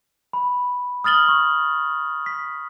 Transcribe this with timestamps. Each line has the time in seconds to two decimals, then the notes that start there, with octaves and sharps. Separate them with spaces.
0.33 B5
1.04 D#6 F6 A6 F#7 G7
1.28 C#6
2.26 B6